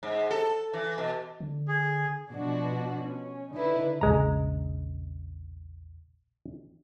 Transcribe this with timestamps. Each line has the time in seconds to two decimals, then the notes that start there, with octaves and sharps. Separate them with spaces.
0.03 G#2
0.31 A4
0.73 E3
0.98 B2
1.40 D3
1.68 G#4
2.30 B2 F3 D4 F#4
3.01 C#4
3.53 D3 D#4 E4 B4
4.01 E1 A#1 C#3 G#3 A#5